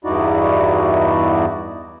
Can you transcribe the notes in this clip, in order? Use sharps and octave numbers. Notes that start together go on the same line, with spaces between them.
E2 G2 D#4 E4 F#4 D5